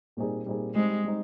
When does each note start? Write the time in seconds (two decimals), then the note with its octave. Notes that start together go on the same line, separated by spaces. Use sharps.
0.17 A#2 G3 C4 D#4 G#4
0.46 A#2 G3 C4 D#4 G#4
0.75 G3 G#3 C4 D#4
1.04 G3 C4 D#4